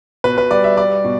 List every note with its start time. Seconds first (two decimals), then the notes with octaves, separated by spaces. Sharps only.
0.24 B2 B4
0.38 B4
0.51 G3 D5
0.64 E5
0.77 G3 D5
1.05 B2